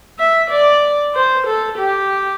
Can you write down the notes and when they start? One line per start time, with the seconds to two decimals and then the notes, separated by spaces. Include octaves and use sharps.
0.19 E5
0.50 D5
1.15 C5
1.47 A4
1.78 G4